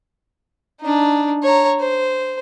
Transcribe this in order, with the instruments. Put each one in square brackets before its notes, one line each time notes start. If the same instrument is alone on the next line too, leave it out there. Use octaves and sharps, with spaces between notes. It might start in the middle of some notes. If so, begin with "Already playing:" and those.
[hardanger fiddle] D4 D#4
C#5 A#5
C5